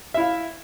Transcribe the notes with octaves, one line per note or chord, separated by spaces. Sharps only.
E4 E5 F5